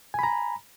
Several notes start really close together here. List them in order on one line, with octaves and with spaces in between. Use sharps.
G#5 B5 A#5